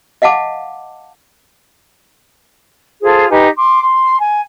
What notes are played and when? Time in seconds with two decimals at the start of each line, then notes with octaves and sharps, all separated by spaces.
0.22 D#5 F5 F#5 A5 D6
3.02 F4 G#4 A4 C5
3.30 D#4 G4 B4 G#5
3.56 C6 D6
3.81 C6
4.18 G#5